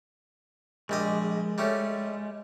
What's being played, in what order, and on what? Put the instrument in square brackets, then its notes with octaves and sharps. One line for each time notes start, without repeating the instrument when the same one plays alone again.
[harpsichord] A#1 G3 D#5 [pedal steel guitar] G#3
[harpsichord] G3 A3 C#4